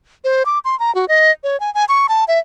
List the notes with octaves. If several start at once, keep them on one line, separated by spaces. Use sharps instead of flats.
C5
D6
C6
A#5
F#4
D#5
C#5
G#5
G#5
C#6
A5
E5